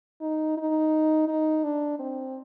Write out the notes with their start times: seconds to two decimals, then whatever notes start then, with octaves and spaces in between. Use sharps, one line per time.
0.21 D#4
0.57 D#4
1.27 D#4
1.64 D4
1.99 C4